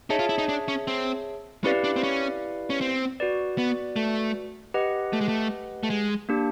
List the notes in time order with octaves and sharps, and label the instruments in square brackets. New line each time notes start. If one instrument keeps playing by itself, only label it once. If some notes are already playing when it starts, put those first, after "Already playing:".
[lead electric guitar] D#4 [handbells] G#4 C#5 E5 A5
[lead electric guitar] F4
E4
D#4
D4
C#4
C4
[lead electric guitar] C#4 [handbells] E4 G4 B4 D5 F5
[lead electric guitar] D4
C4
C#4
C#4
C4
[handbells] F#4 B4 D5
[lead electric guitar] B3
A3
[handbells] G4 B4 D#5 F#5
[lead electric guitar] A3
G#3
A3
A3
G#3
[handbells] A#3 D4 G4